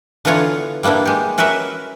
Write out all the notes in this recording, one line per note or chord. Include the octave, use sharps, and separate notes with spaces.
D3 E3 B3 F4 C#5 A#5
G3 A#3 B3 D4 E4
G#3 G4
C#4 F#4 A#4 B4 E5